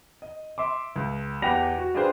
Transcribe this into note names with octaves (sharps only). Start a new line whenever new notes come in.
D#5
E5 C6 D6
C#2
E2 G4 F#5 B5 A#6 F7
F#4
D4 F4 G4 G#4 B4 C5